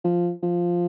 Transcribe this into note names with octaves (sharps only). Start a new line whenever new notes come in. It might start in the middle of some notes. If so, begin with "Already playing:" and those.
F3
F3